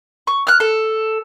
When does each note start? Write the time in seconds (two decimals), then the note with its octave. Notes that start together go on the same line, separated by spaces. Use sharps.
0.27 C#6
0.47 F6 F#6
0.60 A4